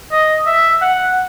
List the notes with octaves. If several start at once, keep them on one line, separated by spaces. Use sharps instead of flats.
D#5
E5
F#5